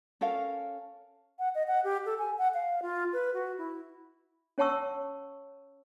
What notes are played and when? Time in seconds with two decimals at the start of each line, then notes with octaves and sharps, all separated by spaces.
0.21 C#4 A4 A#4 F5
1.39 F#5
1.55 D#5
1.67 F#5
1.84 G4
2.06 A4
2.19 G#5
2.38 F#5
2.54 F5
2.82 F4
3.13 B4
3.34 F#4
3.58 E4
4.58 C#4 C#5 F#5 A5 C#6 E6